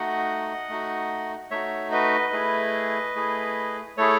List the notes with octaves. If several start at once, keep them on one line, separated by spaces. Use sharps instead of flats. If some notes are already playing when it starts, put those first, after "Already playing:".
Already playing: A3 D#4 F#4 D#5 F#5
A3 D#4 F#4
A3 D#4 F#4 C#5 E5
B4 D#5
A3 E4 G#4
A3 E4 G#4
A3 E4 G#4 A4 C#5